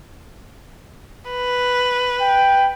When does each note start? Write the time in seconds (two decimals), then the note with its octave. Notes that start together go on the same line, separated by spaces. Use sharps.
1.30 B4
2.21 G5